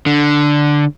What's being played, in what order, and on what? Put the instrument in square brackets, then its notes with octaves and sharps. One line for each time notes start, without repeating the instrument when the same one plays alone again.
[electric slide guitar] D3